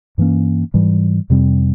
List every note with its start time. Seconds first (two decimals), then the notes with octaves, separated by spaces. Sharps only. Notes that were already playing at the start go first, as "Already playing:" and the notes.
0.18 G2 E3 A#3 C#4
0.74 G#2 E3 G3
1.30 F2 C3 G3 C4